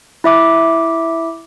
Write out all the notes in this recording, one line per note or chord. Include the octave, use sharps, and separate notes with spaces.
E4 E5 D6